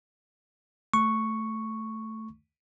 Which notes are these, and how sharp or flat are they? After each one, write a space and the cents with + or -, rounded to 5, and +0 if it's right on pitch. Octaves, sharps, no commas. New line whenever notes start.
A3 +0 C#6 +0